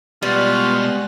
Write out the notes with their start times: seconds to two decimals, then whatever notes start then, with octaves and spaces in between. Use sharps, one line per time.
0.22 B2 G3 G#3 F4 F#5